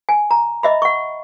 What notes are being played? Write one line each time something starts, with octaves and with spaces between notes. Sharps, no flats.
G#5
A#5
D#5 E5 B5
F#5 C#6